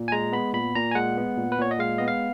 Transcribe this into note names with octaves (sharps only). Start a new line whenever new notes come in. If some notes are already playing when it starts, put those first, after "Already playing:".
Already playing: A#2
G#5
G#3 A#5
B3 B5
A#2 B5
A#2 A#5
G#5
G#3 F#5
B3
A#2
B4
A#2 C#5
D#5
G#3 F5
B3 D#5
F5